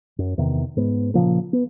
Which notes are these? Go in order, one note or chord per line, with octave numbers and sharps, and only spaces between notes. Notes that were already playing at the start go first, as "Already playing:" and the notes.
F#2
E2 C3 D#3
G#2 B3
A#2 C#3 F3 A#3
B3